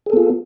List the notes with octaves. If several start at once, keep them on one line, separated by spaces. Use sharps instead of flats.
B3 F4 G#4 A4